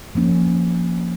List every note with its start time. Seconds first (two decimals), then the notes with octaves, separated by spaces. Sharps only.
0.15 F3 A#3 C#4